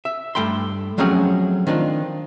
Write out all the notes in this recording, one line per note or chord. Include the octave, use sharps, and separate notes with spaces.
E5
G2 A3 G5 B5 C6
F3 F#3 A3 C4 C#4 G#4
D#3 C4 D4 F4